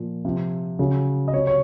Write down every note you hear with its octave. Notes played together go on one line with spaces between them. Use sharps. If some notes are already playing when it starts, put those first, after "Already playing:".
Already playing: A#2 F3
C3 F3
C#3 F#3
D#5
C3 F#3 C#5
C#5